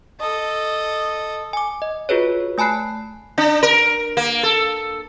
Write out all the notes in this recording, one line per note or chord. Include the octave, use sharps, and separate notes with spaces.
A4 D#5
G#5 D6
D#5
F4 F#4 G#4 B4 C#5
A3 G#5 A5 B5 F#6 C7
D4
A#4
A#3
A4